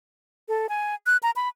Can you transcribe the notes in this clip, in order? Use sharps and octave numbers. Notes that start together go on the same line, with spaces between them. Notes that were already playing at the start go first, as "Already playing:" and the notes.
A4
G#5
F#6
A#5
B5